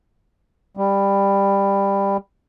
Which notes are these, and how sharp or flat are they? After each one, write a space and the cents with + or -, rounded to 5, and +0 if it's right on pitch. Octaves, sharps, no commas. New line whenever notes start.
G3 +15